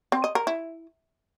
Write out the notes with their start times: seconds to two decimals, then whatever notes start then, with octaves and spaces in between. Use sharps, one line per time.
0.12 C4
0.24 D#5
0.35 A#4
0.47 E4